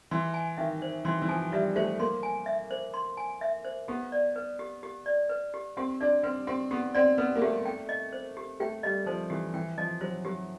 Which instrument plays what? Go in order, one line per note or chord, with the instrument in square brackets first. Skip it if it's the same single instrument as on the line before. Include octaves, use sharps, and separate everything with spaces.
[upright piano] E3 [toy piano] C6
[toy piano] G#5
[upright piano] D#3 [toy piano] E5
[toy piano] C5
[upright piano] E3 [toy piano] C6
[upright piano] E3
[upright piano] F3 [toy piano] G#5
[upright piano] G3 [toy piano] E5
[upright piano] A3 [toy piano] C5
[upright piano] A#3 [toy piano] C6
[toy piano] G#5
E5
C5
C6
G#5
E5
C5
[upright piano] B3 [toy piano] G4
[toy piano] D5
B4
G4
G4
D5
B4
G4
[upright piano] C4 [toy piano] G4
[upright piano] D4 [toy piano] D5
[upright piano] C4 [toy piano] B4
[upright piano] C4 [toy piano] G4
[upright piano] B3 [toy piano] G4
[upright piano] C4 [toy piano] D5
[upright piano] B3 [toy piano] B4
[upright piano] A#3
[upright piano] A3 [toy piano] G4
[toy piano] G5
D#5
C5
G4
[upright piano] A3 [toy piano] G5
[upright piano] G3 [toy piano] D#5
[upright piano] F3 [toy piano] C5
[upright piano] E3 [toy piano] G4
[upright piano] E3 [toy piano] G5
[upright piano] F3 [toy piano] D#5
[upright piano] F#3 [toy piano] C5
[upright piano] F#3 [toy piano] G4